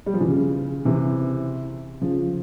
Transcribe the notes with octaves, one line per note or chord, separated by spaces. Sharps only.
G3
F3
E3
C#3
C3 E3
C#3 F3